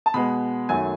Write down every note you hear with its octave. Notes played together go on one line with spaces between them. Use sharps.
A5
B2 G#3 B3 B5
F#2 D#3 F#3 A3 G#5